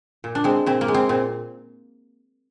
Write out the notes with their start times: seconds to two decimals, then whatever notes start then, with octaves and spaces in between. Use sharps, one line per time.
0.24 A#2
0.35 D4
0.44 G#3 C4
0.66 A#2 C4
0.81 A#3
0.88 G#3
0.94 C4
1.09 A#2 C4